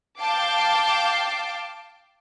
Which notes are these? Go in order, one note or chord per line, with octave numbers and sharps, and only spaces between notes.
F5 G5 A5 D6 C7